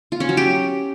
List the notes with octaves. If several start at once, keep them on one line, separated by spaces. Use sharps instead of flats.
F4
C#4
F#3
G4